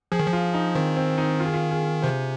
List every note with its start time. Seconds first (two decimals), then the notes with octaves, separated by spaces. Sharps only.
0.12 F3 G#4
0.20 D#3
0.27 F3
0.33 F4
0.54 D#4
0.75 D#3 C4
0.96 C4
1.18 D#4
1.40 F4
1.46 G#4
1.53 F4
1.71 G#4
2.02 C3 C5